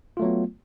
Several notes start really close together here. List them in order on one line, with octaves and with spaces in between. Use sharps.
F4 A3 F#3 B3